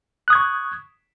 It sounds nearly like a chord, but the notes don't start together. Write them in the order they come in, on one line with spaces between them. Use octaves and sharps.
F#6 D#6 G#6 C#6